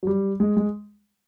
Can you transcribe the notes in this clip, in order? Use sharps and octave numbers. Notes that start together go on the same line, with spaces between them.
F#3
G3
G#3
G#3